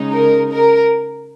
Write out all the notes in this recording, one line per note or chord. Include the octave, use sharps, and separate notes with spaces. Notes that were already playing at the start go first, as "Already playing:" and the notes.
Already playing: C#3 G#3 D#4
A#4
A#4